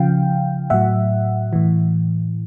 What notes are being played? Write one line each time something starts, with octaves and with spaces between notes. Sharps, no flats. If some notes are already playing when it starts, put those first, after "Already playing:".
Already playing: C#3 F3 F5 G5
A2 F#3 E5 F#5
A2 E3